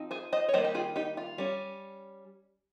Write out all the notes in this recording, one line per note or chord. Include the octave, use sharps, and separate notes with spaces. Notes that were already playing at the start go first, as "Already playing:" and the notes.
Already playing: F3 C4 D#4
G#4 C5
C5 D#5
C#5
D#3 G3 A#3 C5 D#5
G4
F4 G#4
D#4 G4
F4
G3 C#4